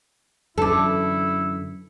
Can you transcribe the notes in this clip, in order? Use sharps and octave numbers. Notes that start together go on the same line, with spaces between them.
F#2 D3 E3 E4 A4 A5 D6